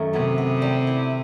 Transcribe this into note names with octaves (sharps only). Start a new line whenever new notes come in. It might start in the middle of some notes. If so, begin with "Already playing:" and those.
Already playing: F#2 D#3 A3
C3 B3
B3
G3
E4